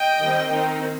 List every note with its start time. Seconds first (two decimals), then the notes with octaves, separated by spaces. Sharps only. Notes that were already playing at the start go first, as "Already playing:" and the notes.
Already playing: D#5 G5
0.21 D#3 G3 C4
0.52 D#3 C4 D#4